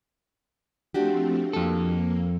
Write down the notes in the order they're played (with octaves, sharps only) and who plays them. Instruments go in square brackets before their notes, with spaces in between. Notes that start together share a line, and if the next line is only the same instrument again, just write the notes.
[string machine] F3 A3 C4 [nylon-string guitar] D4 F#4 G4
[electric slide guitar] F2 A4 [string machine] A#3